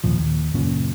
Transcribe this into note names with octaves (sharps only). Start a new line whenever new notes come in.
D#2 A#2 F3
D#2
F#1 A#2 C#4